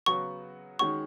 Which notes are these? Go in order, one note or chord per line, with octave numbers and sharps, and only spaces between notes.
C#3 F#3 B3 F#4 C#6
D#3 G#3 C#4 F#4 C#6